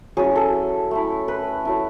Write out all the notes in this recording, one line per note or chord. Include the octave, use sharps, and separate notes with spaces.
F#3 C#4 E4 G#4
A4
A3 E4
B4
F#3 A3 E4